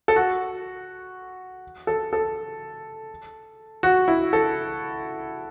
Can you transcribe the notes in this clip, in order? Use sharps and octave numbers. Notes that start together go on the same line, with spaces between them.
A4
F#4
A4
A4
F#4
E4
A4